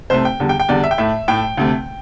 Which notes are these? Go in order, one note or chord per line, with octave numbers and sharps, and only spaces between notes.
C2 C3 A3 C5
G5
E2 D3 G3
G5
G5
E2 D3 G3 D5
E5
G5
A2 A3 E5
A2 A3 G5
D2 C3 A3